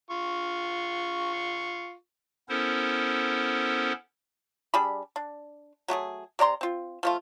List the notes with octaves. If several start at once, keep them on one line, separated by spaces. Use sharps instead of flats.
F4 C#6
B3 C#4 E4 A4 A#4 C5
G3 D4 G#4 B5
D4
F#3 A3 G4 G#4
C3 D5 A#5 C6
C4 F4
F3 A3 F4